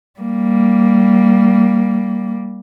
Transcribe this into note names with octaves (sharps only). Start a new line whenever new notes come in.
G3 A#3